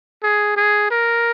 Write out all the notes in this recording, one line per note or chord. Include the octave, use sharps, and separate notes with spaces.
G#4
G#4
A#4